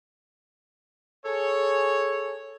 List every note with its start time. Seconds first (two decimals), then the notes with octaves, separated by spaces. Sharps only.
1.25 G#4 A4 C#5